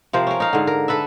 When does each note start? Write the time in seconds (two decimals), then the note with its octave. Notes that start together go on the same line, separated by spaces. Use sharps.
0.13 C3 F3 A#4 C5
0.27 C#4 A#4
0.40 D#4 F5
0.53 G#2 D3
0.67 A#4
0.88 A4 B4 E5